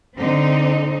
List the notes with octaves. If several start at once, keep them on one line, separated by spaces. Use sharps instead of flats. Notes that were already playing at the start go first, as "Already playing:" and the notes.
D3 C4 D#4